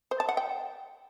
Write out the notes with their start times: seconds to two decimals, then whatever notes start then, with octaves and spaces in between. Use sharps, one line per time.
0.11 C5
0.20 A5
0.29 F#5
0.37 G5